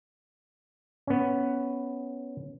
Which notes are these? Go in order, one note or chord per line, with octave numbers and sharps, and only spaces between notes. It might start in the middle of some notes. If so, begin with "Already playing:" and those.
B3 C#4